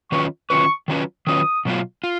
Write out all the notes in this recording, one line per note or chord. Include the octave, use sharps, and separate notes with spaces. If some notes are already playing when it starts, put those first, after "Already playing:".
D#3 F#3 C#4 F4 B4 C#6
D#3 F#3 C#4 F4 B4 C#6
D#3 F#3 C#4 F4 B4
D#3 F#3 C#4 F4 B4 D#6
B2 F#3 B3 F4
F4